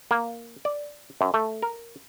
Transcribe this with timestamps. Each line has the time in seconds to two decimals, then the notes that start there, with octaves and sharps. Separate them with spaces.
0.11 A#3
0.65 D5
1.21 F#2
1.34 A3
1.62 A#4